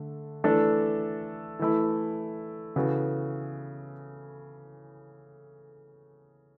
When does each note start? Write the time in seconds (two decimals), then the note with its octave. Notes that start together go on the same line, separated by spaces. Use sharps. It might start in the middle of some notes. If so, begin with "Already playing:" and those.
Already playing: D3 A3
0.44 E3 A3 D4 A4
1.59 E3 A3 E4
2.76 C#3 E3 B3 F#4 A4